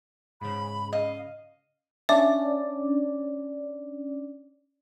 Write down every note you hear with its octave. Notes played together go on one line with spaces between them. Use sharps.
G#2 C#3 B5
D#5 F5
C#4 D4 D5 E5